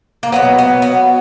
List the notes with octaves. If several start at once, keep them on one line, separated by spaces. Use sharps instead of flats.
A#3
B2 F#3 B3
B3
B3